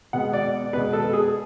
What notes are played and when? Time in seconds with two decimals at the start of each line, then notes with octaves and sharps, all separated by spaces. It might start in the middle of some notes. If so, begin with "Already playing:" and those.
0.13 B2 G#3 B3 F#5
0.33 D5
0.73 B2 G#3 B3 B4
0.93 A4
1.13 G#4